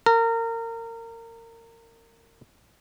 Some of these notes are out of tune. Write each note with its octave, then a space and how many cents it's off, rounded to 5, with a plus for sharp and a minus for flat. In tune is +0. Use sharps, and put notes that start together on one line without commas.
A#4 -25